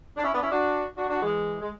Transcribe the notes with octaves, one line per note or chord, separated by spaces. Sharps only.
D4
C#4 E4
B3 D4
C#4 E4
D4 F#4
D4 F#4
D4 F#4
E3 G#3
G#3